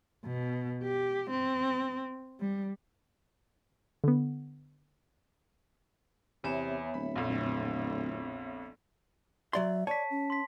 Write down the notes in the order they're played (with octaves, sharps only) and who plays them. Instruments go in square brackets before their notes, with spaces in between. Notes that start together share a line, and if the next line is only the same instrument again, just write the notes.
[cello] B2
G4
C4
G3
[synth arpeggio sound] D3 B3
[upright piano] E2 [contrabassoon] C3 [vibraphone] B3 C#5 E5
[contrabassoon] D1 [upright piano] B5
[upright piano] A#1 F2
[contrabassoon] D1
[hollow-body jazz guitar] F#3 D5 C6 [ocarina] E5
[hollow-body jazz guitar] C#5 [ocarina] D5 [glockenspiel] A5 B6
[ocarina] C#4
[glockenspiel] C6 B6